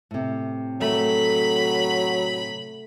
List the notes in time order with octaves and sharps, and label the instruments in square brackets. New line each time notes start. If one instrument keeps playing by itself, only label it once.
[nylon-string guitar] A2 C3
[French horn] F#3 [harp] A3 [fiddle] B5